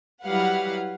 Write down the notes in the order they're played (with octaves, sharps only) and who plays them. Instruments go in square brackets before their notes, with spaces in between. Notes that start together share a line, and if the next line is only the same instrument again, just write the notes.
[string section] F#3 G3 E4 B4 F5 F#5